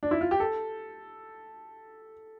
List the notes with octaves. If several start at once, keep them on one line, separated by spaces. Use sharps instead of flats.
D4
E4
F4
G4
A4